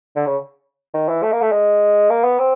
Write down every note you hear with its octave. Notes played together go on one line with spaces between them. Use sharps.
D3
C#3
D#3
E3
A3
A#3
A3
G#3
A#3
B3
C4